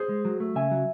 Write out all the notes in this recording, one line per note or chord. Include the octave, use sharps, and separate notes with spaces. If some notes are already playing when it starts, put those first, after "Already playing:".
Already playing: G#4 C5
G#3
F#3
A3
C#3 E5 G#5
F#3